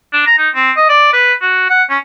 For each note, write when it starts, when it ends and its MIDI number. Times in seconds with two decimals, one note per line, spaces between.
0.13 0.22 62
0.27 0.37 82
0.38 0.49 63
0.55 0.71 60
0.76 0.86 75
0.89 1.10 74
1.13 1.33 71
1.42 1.65 66
1.70 1.83 78
1.90 1.98 61